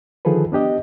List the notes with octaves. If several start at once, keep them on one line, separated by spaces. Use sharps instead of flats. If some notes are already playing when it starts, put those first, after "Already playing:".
D3 D#3 F3 G#4 A4 B4
B3 D4 G4 D#5